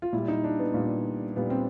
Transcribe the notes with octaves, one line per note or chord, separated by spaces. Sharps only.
F4
A#2 G3 E4
D#4
D4
B3
A#2 G3
A#2 G3 B3
C4